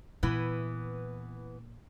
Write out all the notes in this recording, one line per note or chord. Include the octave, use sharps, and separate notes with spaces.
A#2 E3 B3